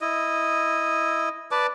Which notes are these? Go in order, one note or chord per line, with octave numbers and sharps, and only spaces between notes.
E4 D#5
B4 D5 A5 D6